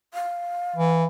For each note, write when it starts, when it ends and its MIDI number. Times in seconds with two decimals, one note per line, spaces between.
0.14 1.06 77
0.76 1.05 52